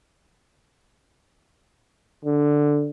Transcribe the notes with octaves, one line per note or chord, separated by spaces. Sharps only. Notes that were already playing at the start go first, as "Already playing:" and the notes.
D3